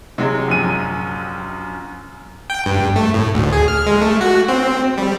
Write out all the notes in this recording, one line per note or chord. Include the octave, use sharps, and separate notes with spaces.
C3 F#3 G#3
A#1 F#2 D#7
G5
G2
A3
A2
D2
G#4
F6
G#3
A3
F#4
C4
G3